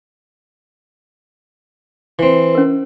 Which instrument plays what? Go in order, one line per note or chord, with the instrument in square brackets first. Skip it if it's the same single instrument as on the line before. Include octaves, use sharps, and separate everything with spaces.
[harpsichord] E3 C4
[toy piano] C#4 A#4